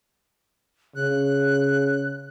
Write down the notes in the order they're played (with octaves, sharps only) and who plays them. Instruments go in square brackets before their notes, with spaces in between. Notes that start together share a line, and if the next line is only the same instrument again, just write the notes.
[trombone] C#3 [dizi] F#6